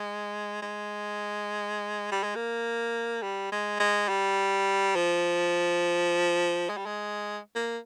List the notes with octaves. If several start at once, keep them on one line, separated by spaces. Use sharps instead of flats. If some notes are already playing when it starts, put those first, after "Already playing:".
Already playing: G#3
G#3
G3
G#3
A#3
G3
G#3
G#3
G3
F3
G#3
G3
G#3
A#3